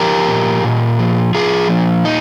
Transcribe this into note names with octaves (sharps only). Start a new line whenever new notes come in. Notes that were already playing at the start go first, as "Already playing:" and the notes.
Already playing: F3 G4 A#4
A#2
A#2
F3
F3 F4 G#4
A#2
D#4